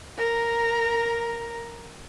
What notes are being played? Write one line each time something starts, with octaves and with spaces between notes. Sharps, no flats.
A#4 A#5